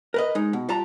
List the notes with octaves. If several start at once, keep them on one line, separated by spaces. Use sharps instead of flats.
A#4 B4 D#5
G#3 D#4
B2
G3 F4 A5 A#5